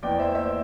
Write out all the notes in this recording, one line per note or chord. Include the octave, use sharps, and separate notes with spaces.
E2 E3 D5 G5
C5 E5
C5 E5